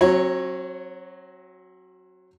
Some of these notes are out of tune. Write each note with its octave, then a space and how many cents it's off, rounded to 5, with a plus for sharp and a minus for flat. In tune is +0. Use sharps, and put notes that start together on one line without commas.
F#3 +0 C4 +40 C#5 +0